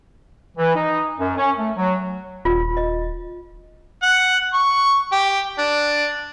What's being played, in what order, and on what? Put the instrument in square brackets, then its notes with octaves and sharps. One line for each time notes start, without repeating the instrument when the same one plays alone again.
[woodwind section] E3
D#4
F#2
C#4
A3
F#3
[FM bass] D#1 [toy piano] F4
[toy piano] D#5
[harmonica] F#5
C#6
G4
D4